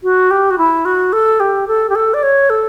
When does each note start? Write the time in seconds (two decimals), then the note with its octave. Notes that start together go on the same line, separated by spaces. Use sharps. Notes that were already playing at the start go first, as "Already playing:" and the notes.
0.03 F#4
0.31 G4
0.51 F#4
0.58 E4
0.85 F#4
1.13 A4
1.40 G4
1.68 A4
1.90 G4
1.95 A4
2.14 D5
2.23 C#5
2.50 A4